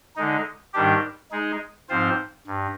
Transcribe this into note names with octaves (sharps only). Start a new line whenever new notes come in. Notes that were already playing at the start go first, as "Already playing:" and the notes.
D3 G#3 D#4
G#2 D#3 G3 D4 G4
G#3 D#4 G#4
G#2 F3 C4 F4 C5
G2